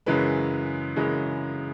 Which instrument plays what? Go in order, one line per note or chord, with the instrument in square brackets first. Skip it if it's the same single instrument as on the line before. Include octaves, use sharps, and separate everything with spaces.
[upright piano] F#2 C#3 E3 G#3 B4
F#2 C#3 E3 G#3